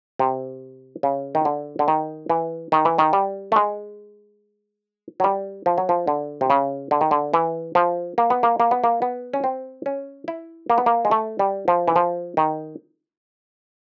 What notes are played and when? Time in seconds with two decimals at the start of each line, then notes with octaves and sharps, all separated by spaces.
0.19 C3
1.03 C#3
1.35 D#3
1.45 D3
1.79 D3
1.88 D#3
2.30 E3
2.72 D#3
2.85 E3
2.98 D#3
3.13 G3
3.52 A3
3.56 G#3
5.20 F#3
5.24 G3
5.66 F3
5.78 F#3
5.89 F3
6.07 D3
6.41 C3
6.50 C#3
6.91 D3
7.01 D#3
7.11 D3
7.34 E3
7.75 F3
8.18 A#3
8.30 B3
8.43 A#3
8.60 A#3
8.71 B3
8.84 A#3
9.02 B3
9.34 C#4
9.44 C4
9.86 C#4
10.28 E4
10.70 A#3
10.78 B3
10.86 A#3
11.05 G#3
11.11 A3
11.39 G3
11.68 F3
11.88 E3
11.96 F3
12.37 D#3